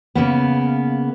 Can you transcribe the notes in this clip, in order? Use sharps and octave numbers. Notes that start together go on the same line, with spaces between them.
C#3 A#3 B3